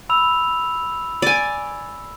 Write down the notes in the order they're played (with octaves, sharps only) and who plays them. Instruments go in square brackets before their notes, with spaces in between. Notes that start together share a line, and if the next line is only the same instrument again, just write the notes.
[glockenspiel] B5 E6 F7
[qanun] D5 G#5